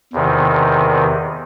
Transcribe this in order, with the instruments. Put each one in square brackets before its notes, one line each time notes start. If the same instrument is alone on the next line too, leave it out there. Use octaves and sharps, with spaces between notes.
[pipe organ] E2 C3 D#3